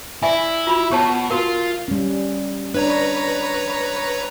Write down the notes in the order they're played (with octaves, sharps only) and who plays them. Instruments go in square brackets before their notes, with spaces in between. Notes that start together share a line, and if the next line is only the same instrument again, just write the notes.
[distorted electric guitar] E4 [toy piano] D5 E5 G#5
[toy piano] F4 F#4 B5
[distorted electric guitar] B2 [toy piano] G4 C#5 A5
[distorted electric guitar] F4 [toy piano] F#4 A#4
[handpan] G3 C#4
[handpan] D4 [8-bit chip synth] B4 C#5 A#5